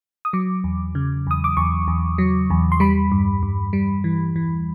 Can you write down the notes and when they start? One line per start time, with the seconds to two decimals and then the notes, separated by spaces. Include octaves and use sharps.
0.25 D#6
0.33 F#3 D6
0.64 E2
0.95 C#3
1.27 E2 D#6
1.44 D6
1.57 E2 C#6
1.88 E2
2.18 F#3
2.50 E2
2.72 C6
2.80 G3 B5
3.12 G2
3.43 G2
3.73 G3
4.04 E3
4.36 E3